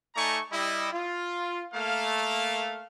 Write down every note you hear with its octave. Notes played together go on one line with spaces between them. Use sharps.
A3 D#4 D5 G#5 A#5 C#6
G3 E4 D#5
F4
A3 A#3 F5